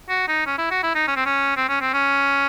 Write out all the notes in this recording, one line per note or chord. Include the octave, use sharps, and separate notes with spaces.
F#4
D#4
C#4
E4
F#4
E4
D#4
C#4
C4
C#4
C4
C#4
C4
C#4